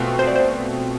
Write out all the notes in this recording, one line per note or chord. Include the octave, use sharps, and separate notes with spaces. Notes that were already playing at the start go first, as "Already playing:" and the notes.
Already playing: B2 A3 C4 F4
C5
D5
C5